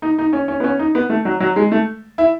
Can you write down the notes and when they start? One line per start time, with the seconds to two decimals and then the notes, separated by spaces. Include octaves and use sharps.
0.02 D#4
0.18 D#4
0.33 C#4
0.48 C#4
0.60 B3
0.64 C#4
0.79 D#4
0.95 B3
1.10 A3
1.25 F#3
1.40 F#3
1.56 G#3
1.72 A3
2.18 E4